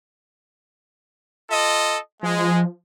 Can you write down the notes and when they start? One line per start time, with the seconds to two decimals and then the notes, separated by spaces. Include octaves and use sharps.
1.51 F4 A4 D#5
2.23 F3 G#3